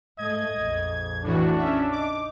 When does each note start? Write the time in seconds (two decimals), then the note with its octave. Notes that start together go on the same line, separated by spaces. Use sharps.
0.18 G#2 A3 D#5 G#6
0.56 A#1 F2
1.24 A2 E3 D4 F#4
1.58 C#4 E5
1.92 D#4 D6